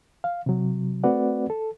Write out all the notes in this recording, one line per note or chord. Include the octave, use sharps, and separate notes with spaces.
F5
C3 F#3
A3 C4 F#4 B4 D5 F#5
A4